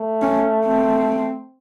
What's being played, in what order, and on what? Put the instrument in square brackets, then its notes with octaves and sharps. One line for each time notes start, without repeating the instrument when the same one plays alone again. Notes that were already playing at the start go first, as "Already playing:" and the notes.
Already playing: [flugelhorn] A3
[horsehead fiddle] C#4
C4